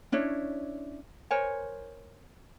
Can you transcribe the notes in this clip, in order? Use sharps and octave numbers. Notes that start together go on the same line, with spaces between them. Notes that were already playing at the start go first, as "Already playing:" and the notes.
C#4 D4 E4 C#5
A#4 C5 C#5 G#5